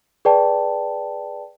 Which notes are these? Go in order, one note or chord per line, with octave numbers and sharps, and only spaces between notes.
G#4 B4 D5 G5 A5